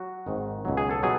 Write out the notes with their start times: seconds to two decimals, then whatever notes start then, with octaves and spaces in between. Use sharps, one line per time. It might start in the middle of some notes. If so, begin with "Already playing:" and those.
Already playing: F#3 F#4
0.27 G#1 G#2 D#3
0.65 C#2 B2 F#3
0.77 G#4
0.91 A4
1.03 B2 F#3 G#4